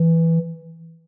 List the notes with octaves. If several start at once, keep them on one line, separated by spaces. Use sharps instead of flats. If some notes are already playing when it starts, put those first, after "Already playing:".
Already playing: E3